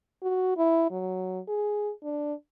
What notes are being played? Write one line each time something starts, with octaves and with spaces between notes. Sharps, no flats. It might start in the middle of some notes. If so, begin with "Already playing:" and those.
F#4
E4
F#3
G#4
D4